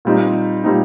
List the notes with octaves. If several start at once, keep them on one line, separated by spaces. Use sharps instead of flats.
A#2 G3 C4 D#4
A#2 G3 C4 D#4